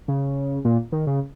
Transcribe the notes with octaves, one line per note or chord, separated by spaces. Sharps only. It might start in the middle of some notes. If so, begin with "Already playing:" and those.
C#3
A#2
D#3
C#3